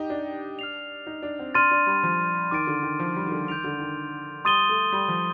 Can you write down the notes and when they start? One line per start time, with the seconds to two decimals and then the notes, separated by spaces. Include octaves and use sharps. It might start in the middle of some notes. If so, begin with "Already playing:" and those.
Already playing: D#4 G4
0.10 D4
0.59 F6 C7 F7
1.07 D#4
1.22 D4
1.39 C4
1.54 D4 C6 F6 A6 D#7
1.71 D4
1.87 G3
2.03 F3
2.51 D#3 D6 A6 D7
2.67 D3
2.83 D#3
2.99 F3
3.16 G3
3.27 D#3
3.32 D3
3.48 D#3 G6 D7 F7
3.64 D3
3.80 D#3
4.45 G3 C6 D#6 A6 D#7 G7
4.69 A3
4.92 G3
5.08 F3